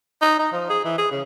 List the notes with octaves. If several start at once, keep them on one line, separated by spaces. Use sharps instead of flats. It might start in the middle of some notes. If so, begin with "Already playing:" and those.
D#4
D#4
F3
G#4
E3
G#4
C#3